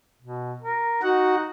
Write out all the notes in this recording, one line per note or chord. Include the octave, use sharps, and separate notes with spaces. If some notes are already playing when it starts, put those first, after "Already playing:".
B2
A#4
D#4 F#4 F#5